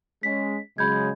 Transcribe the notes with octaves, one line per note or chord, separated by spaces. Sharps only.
G#3 C#4 B6
C#3 F#3 G#3 B5 G6 G#6